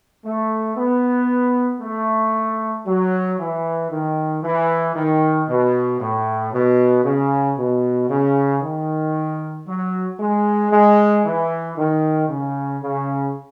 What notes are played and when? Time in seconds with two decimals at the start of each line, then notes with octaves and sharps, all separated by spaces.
0.25 A3
0.76 B3
1.81 A3
2.86 F#3
3.39 E3
3.91 D#3
4.43 E3
4.95 D#3
5.49 B2
6.00 A2
6.53 B2
7.05 C#3
7.57 B2
8.10 C#3
8.63 D#3
9.67 F#3
10.19 G#3
10.71 G#3
11.25 E3
11.77 D#3
12.29 C#3
12.82 C#3